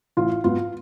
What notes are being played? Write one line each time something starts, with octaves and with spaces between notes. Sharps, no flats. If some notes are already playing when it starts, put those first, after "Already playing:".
A1 F4
G#2 F#3 B3 F4